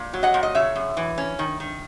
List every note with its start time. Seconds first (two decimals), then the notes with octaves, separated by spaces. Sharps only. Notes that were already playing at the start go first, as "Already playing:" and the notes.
Already playing: A#2
0.13 F#3
0.23 D#5 F#5
0.34 A#2
0.43 D#5
0.55 C#3 C#5 E5
0.75 F#2
0.97 E3
1.18 C#4
1.39 D#3
1.60 D#3